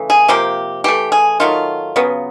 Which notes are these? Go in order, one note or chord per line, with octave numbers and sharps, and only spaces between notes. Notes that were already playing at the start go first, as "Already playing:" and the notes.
Already playing: C#3 E3 A3
G#4
C3 F3 A#3 G4
E3 A3 G4
G#4
D#3 F#3 A3 F4
C#3 F#3 B3